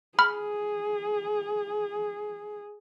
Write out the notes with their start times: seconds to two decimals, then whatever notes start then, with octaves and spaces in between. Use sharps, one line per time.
0.19 G#4 B5 F6